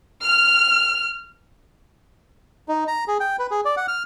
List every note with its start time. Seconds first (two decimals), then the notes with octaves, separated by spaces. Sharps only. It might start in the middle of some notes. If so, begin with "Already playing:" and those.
0.23 F6
2.69 D#4
2.87 A#5
3.08 G#4
3.20 G5
3.39 B4
3.51 G#4
3.65 D5
3.77 F#5
3.88 F6